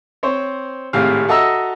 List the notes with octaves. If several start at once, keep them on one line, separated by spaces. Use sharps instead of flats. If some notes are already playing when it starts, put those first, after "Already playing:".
C4 C5 C#5
G#1 A2 C3 F5
F#4 A4 D#5 E5 A#5 E6